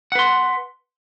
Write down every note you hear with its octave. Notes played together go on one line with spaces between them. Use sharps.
B4 F#5 C6